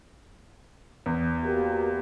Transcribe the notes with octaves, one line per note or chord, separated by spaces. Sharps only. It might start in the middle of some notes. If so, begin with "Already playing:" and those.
E2
A#3 F#4 G4